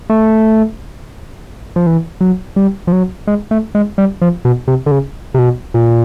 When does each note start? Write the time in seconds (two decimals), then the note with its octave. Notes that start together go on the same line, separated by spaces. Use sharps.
0.10 A3
1.76 F3
1.86 E3
2.21 F#3
2.56 G3
2.87 F3
2.92 F#3
3.27 G#3
3.51 A3
3.75 G#3
3.98 G3
4.22 F3
4.45 B2
4.68 C3
4.86 D3
4.91 C#3
5.34 C3
5.39 B2
5.74 A#2